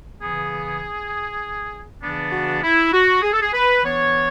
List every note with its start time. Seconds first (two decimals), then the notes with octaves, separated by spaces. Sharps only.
0.21 C#3 E3 B3 G#4
2.02 C#3 E3 B3 D4
2.32 F#4
2.63 E4
2.92 F#4
3.22 G#4
3.32 A4
3.41 G#4
3.52 B4
3.83 E3 B3 D4 C#5